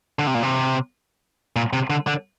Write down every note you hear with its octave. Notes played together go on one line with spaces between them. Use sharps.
D3
C3
A#2
C3
A#2
C3
D3
D3